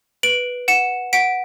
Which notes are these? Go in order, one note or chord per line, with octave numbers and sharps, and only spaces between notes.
B4 D7 F#7
F#5 C#7 E7
F#5 B6 D7